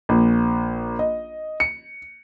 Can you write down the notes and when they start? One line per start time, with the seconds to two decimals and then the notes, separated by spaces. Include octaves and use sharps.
0.09 A#1
0.99 D#5
1.60 C#7